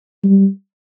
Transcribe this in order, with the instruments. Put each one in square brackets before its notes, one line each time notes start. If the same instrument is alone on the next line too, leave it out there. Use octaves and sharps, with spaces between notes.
[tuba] G3